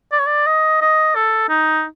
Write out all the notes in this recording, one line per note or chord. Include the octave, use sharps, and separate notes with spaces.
D5
C#5
D5
D#5
D#5
A4
D#4